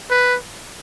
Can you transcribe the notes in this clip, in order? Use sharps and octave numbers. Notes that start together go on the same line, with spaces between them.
B4